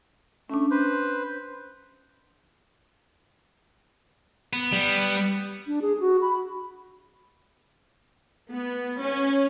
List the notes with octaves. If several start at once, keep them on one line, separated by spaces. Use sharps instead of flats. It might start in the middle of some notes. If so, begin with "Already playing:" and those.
A3 C#4 D4
B4 C5
B3
G3
D4
G#4
F#4
B5
B3
C#4